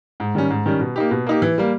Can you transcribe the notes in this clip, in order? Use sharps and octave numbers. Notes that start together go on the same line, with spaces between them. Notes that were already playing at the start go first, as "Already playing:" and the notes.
G#2
D#3 G3 C#4
G#2
D#3 G3 C#4
B2
A#3 D#4 G4
B2
A#3 D#4 G4
E3
G3 A#3